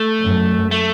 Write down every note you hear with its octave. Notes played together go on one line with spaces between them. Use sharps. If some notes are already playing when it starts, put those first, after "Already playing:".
Already playing: A3
F#2
A3